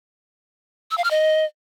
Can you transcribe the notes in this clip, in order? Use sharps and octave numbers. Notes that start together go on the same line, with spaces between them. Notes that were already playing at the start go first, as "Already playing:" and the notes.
E6
F5
F6
D#5